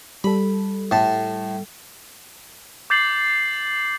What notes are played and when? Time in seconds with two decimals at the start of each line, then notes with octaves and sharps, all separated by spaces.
0.24 G3 A4 B5
0.91 A2 A5
2.90 D6 G6 A6 C7 F#7